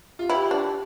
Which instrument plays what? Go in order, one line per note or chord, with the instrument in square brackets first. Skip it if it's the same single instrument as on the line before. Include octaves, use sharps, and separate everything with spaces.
[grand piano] F4
[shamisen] E4 [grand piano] G4
[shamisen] D4